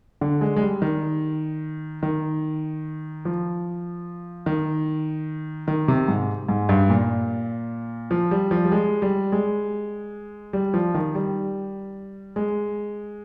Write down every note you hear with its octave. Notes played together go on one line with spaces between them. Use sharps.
D3
G#3
G#3
G3
D#3
D#3
F3
D#3
D#3
C3
G#2
G#2
G2
A#2
F3
G3
F3
G3
G#3
G3
G#3
G3
F3
D#3
G3
G#3